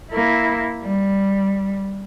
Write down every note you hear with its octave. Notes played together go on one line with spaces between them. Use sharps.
A#3 E4
G3